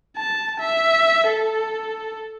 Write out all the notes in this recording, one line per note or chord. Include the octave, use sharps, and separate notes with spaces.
A5
E5
A4